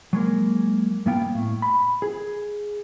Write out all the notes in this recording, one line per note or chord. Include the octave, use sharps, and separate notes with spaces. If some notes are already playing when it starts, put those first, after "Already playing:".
F#3 G#3 A#3
G2 A#3 B3 F5 G5
A2
B5
G#4